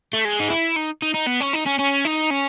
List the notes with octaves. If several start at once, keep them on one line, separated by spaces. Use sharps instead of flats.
A3
G#3
D#4
E4
D#4
D#4
D#4
B3
C#4
D#4
C#4
C#4
D#4
C#4